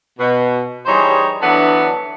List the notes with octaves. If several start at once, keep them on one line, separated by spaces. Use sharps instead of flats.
B2
E3 G3 D#4 G#4 C5 C#5
D3 E3 F#3 B3 D4